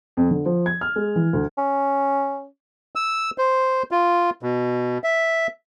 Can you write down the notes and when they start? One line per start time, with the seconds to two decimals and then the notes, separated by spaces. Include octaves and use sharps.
0.17 F2
0.31 D3
0.45 F3
0.66 G#6
0.81 F6
0.96 G#3
1.16 E3
1.33 D2
1.57 C#4
2.95 E6
3.38 C5
3.91 F4
4.43 B2
5.04 E5